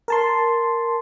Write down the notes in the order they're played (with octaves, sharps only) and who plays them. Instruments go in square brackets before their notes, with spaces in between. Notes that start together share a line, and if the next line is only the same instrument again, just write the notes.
[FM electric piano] A#4 A5 C6